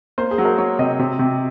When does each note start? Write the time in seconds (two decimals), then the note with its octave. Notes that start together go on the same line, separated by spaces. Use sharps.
0.18 A#3 C5
0.31 G#4
0.38 F#3
0.45 A#4
0.58 F#3 C#5
0.79 C3 D#5
0.99 C3
1.19 C3